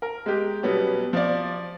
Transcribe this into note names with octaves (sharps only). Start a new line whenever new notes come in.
A#4
G#3 G4
B2 F#3 G3 B3 C#4
F3 D5